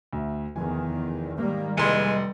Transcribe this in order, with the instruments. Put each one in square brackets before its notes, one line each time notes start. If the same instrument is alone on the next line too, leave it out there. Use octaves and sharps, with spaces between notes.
[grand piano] D2 E5
[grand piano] F1 E3 G#5 [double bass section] E2 D#3
[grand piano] G#2 [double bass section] D#3 G3 A#3
[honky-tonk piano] F1 C6 [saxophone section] E3 G#3 [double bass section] G3 [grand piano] C#7